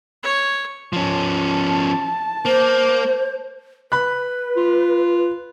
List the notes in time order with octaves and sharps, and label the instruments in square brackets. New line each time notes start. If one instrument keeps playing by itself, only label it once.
[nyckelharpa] C#5
[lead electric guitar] F3 C#4 [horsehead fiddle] A5
[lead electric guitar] A#3 [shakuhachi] C5
[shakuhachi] B4 [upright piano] B5 F#6
[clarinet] F4